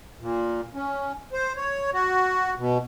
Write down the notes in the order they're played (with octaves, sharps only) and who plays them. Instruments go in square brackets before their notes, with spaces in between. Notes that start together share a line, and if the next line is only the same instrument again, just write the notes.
[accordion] A#2
C#4
C5
C#5
F#4
B2